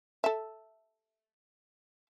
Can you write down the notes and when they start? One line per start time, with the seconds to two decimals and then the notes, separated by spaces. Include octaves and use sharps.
0.24 A4 E5